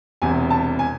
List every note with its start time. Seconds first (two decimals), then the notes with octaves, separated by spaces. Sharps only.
0.22 E1 E2 C3 G#5
0.51 A5
0.79 G#5